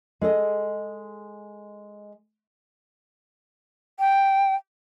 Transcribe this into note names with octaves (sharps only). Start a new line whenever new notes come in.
G#3 A4 D#5
G5